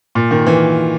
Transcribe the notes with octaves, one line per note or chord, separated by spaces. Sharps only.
A#2
D#3
E3